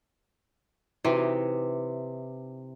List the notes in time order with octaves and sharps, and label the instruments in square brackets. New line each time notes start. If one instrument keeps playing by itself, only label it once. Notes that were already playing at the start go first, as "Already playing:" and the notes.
[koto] C3 [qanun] E3 D#4 G4 [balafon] E4 F#4